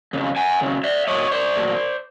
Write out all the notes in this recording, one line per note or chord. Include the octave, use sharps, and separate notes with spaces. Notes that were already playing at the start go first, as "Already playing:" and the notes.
F2 C#3
F#5 G#5
F2 C#3 F#3
D5 E5
A#2 F#3 A3 C#5 D#5
C5 D5
A#2 F#3 A3